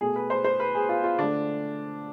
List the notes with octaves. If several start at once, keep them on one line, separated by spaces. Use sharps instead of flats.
B2 A3 G#4
B4
C5
C5
B4
G#4
F4
F4
D3 A3 D4